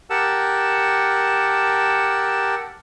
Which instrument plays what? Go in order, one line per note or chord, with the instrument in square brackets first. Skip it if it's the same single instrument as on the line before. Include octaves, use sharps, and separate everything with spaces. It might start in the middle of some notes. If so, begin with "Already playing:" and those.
[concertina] G4 A#4 F#5 A5 E6